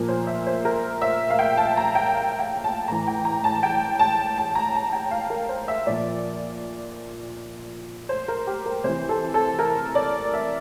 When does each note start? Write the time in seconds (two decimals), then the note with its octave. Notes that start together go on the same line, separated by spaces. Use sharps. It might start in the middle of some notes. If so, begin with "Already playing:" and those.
Already playing: A#2 F3 A#4
0.08 C5
0.27 E5
0.47 C5
0.65 A#4
1.02 E5
1.30 F5
1.39 G5
1.57 A5
1.77 A#5
1.95 G5
2.14 F5
2.39 G5
2.64 A5
2.88 A2 E3 A#5
3.07 G5
3.25 A#5
3.44 A5
3.63 G5
3.99 A5
4.38 A5
4.55 A#5
4.75 A5
4.93 G5
5.11 F5
5.30 A#4
5.49 C5
5.68 E5
5.86 A#2 F3 D5
8.09 C5
8.28 A#4
8.47 G4
8.66 A#4
8.84 C3 E3 C5
9.09 A4
9.34 A4
9.59 A#4
9.95 D5
10.34 E5